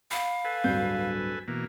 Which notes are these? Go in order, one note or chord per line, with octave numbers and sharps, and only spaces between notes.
F5 B5
A4 B4 G#5
D1 G2 G6
B2 E3 A#3